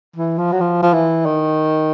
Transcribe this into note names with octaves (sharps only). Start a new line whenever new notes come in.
E3
F3
F#3
F3
F3
E3
D#3